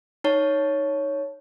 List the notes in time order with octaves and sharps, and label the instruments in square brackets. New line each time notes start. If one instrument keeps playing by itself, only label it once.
[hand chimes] D#4 C#5 A5